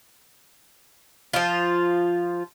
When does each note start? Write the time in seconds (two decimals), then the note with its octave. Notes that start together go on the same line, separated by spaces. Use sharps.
1.33 F3 F4